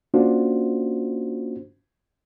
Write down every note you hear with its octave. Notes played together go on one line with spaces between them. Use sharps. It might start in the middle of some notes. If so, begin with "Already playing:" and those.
A#3 C#4 D4 F4 F#4 C5